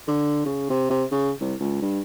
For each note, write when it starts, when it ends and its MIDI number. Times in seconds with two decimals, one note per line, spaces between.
0.08 0.44 50
0.46 0.67 49
0.70 0.85 48
0.90 1.04 48
1.12 1.32 49
1.41 1.55 36
1.60 1.81 37
1.82 2.01 43